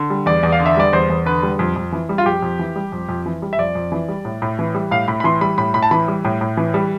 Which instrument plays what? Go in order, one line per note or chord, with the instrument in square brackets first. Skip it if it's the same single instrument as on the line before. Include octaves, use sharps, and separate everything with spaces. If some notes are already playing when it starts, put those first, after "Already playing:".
Already playing: [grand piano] D3
G3
E2 D5
E2
F5
D3
E5
G3 D5
E2 C5
E2
D3 B4
G3
F2
F2
E3
G3
F4
F2 G4
F2
E3
G3
F2
F2
E3
G3
E5
F2 D5
F2
E3
G3
A2
A2
E3
G3
A2 F5
A2 B5
B5
E3 C6
G3 B5
A2 B5
A2 B5
A5
E3 B5
G3
A2
A2
E3
G3